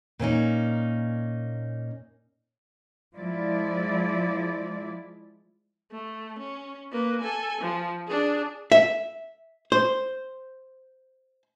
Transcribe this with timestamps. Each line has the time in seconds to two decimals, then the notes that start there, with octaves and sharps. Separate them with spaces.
0.19 A#2 A#3 C#4 D#4
3.15 F3 G#3 E4 D5
5.92 A3
6.38 C#4
6.92 A#3 B4
7.21 A4 G#5
7.61 F3
8.08 D4 G#4
8.72 E5
9.72 C5